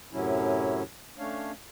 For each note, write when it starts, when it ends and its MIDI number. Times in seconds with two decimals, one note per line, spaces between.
0.13 0.82 42
0.13 0.82 45
0.13 0.82 48
0.13 0.82 54
0.13 0.82 61
0.13 0.82 64
1.18 1.52 57
1.18 1.52 61
1.18 1.52 62
1.18 1.52 73
1.18 1.52 77